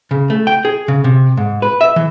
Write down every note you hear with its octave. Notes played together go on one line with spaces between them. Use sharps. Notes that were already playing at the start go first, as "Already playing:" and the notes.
C#3
A3
G5
G#4
C#3
C3
G#2
B4
E5
E3